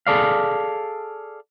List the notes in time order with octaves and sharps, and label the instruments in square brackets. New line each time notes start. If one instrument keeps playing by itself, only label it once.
[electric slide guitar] G#4 A4 D5 F5